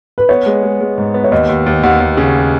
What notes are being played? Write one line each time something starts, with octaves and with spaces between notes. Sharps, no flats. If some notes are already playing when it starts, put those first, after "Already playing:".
B4
B3 C#5
G#3
G#3
G#3
G#2
B3
C#5
D#2 D#5
D#2
D#2
D#2 F#5
D#2
C#3